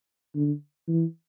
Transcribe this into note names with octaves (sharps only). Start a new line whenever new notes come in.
D3
E3